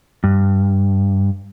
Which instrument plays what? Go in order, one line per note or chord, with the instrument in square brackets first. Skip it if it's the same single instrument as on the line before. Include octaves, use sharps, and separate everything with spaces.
[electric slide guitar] G2